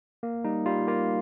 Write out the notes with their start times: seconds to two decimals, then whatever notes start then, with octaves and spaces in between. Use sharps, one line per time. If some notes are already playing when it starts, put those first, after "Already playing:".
0.23 A#3
0.44 G3 D#4
0.66 G3 F4
0.87 A#3 F4